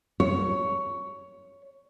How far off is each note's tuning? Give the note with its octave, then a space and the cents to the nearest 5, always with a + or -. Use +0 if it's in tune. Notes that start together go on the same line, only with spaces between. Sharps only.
C#5 +10